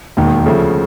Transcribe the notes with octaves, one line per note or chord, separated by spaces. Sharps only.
E1 D#2 D#3
D2 C#3 F3 A3